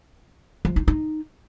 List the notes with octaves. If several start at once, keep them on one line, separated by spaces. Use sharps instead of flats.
F3
D#4
D#4